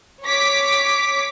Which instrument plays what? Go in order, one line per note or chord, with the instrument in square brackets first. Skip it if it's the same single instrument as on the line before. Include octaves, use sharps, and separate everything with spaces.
[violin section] C#5 D6 B6